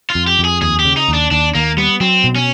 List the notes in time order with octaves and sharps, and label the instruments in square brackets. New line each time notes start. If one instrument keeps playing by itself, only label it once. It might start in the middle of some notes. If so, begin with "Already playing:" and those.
[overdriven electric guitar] F4
[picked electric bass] F2
[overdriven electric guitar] G4
[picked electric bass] F2
[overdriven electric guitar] G#4
[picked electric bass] D#2 [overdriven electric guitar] G#4
[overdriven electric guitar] G4
[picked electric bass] C#3
[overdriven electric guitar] D#4
[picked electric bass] D#2
[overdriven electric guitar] D4
[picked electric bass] D#2 [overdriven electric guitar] D4
[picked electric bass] D#2 [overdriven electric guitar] A#3
[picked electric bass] G3 [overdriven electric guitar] B3
[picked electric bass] F#3 [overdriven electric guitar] C4
[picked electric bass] B2
[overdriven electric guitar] C#4